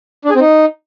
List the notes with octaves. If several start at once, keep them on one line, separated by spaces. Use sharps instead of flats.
D4
G#4
C4
D#4